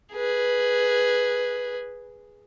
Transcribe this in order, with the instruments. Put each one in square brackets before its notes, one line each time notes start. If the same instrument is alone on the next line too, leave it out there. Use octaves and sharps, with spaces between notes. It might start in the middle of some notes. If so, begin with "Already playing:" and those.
[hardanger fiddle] G#4 B4